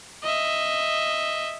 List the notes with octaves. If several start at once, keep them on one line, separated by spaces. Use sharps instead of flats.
D#5 E5